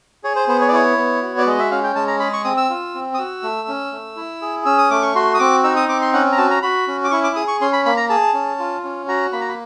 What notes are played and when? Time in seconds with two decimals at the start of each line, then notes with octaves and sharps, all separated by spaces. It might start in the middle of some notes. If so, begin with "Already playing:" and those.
0.24 G#4 C#5
0.36 C5
0.48 B3 C5
0.61 C#5
0.68 D5
0.72 E4 C#5
0.97 B3
1.22 F#4
1.38 D5
1.46 G#3 D#5
1.59 E5
1.71 C#4 F5
1.83 G5
1.95 G#3 A5
2.08 A#5
2.20 G#4 B5
2.33 C#6
2.44 C4 D#6
2.57 E6
2.70 F4
2.95 C4
3.14 D#6
3.18 F#4 E6
3.43 A3
3.68 C#4
3.92 A3
4.16 E4
4.42 G#4
4.65 C#4 E6
4.78 D#6
4.90 A3 D6
5.02 C#6
5.15 F#4 C6
5.34 D#6
5.39 C4 D6
5.64 D#4 E6
5.76 D#6
5.89 C4 D6
6.02 C6
6.14 C#4 F#5
6.32 A#5
6.37 F#4 A5
6.51 A#5
6.62 F#4 B5
6.88 C#4
7.04 D6
7.11 E4 C#6
7.24 D6
7.36 G#4 D#6
7.48 C#6
7.61 C#4 C6
7.73 B5
7.85 A#3 B5
7.97 A#5
8.09 G#4 A5
8.34 C#4
8.59 F4
8.84 C#4
9.08 F#4 A#5
9.32 A#3 B5
9.41 A#5
9.49 B5